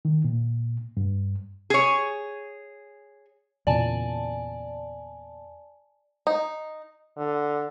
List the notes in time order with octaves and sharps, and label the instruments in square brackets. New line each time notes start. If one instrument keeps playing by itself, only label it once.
[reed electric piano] D#3
A#2
G2
[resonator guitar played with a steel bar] G#4 C#5
[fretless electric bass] E2 A#2 C#3 [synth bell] D5 G#5 A5
[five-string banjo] D#4
[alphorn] D3